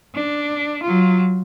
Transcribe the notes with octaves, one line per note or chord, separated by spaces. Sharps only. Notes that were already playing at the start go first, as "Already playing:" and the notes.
D4
F#3 F4